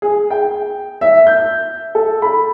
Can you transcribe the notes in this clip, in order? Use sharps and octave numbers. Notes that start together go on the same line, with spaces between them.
G#4
G5
E5
G6
A4
B5